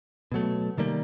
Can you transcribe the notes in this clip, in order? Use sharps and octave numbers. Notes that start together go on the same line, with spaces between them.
B2 F#3 A3
C3 D#3 G3 A#3